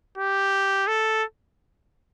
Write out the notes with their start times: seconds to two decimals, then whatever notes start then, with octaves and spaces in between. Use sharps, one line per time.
0.17 G4
0.87 A4